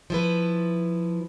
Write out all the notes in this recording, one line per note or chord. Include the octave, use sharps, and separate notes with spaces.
F3 E4 B4